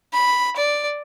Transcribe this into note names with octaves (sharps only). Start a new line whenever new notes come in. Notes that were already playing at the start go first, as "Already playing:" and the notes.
B5
D5